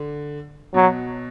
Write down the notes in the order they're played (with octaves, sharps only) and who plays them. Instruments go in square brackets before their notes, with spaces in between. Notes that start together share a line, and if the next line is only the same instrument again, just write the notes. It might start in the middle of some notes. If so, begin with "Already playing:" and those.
Already playing: [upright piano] D3
[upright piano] B2 [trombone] F#3